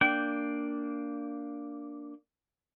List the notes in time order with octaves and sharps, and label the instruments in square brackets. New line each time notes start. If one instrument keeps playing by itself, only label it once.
[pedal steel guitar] A#3 D4 G5